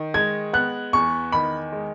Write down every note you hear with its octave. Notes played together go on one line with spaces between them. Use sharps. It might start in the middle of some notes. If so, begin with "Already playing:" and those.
Already playing: D#3
G#3 G#6
B3 F#6
E2 C#6
D#3 B5
G#3